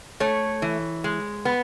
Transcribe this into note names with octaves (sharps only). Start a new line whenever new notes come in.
A3 C#5
E3
G#3
B3